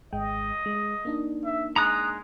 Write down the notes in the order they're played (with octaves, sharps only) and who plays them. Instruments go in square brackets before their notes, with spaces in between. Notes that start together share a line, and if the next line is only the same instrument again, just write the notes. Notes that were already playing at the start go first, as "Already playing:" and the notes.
[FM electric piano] G#1 G#3 G5 [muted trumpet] D#5
[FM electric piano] G#3
A#3 D4 D#4
[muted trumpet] E5
[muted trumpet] G#3 [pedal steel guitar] A#5 D#6 F#6